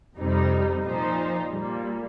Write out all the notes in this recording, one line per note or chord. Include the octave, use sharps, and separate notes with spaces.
F2 C3 G3 D#4
A#2 F3 D#4 C5
A#2 G3 A#3